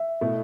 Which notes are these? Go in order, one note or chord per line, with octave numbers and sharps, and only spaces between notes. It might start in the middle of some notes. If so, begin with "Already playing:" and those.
Already playing: E5
B2 A3 E4